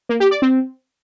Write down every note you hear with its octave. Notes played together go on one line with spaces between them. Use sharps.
A#3
G4
D5
C4